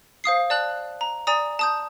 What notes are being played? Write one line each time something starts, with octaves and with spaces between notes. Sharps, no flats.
C5 F5 D#6 C7
D5 A5 F#6 F#7
A#5
D5 G#5 A#5 D#6
A5 D#6 G6